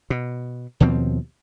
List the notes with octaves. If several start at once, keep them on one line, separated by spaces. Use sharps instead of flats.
B2
D#2 B2 F3 C4